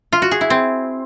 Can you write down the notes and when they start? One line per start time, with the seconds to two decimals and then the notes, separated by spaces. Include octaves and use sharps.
0.13 F4
0.22 F#4
0.31 G#4
0.41 E4
0.50 C4